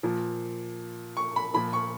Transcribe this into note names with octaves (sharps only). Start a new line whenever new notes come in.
A#2 F3
C#6
B5
A#2 F3 B5
C#6